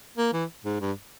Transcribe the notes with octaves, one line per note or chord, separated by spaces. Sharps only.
A#3
E3
G#2
G2